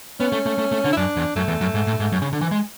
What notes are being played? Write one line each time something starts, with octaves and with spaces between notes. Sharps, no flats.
B3 C#4
A3
A3
A3
A3
D3
E4
F#2 D4
E2
F#2 A3
E2
F#2
G#2
A2
G#2
F#2
C#3
D3
E3
G#3